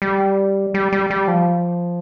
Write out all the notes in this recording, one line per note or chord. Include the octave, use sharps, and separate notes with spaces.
G3
G3
G3
G3
F3